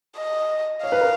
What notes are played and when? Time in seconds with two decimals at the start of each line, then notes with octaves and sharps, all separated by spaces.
0.17 D#5
0.83 C#5 F5
0.92 B4
1.01 A#4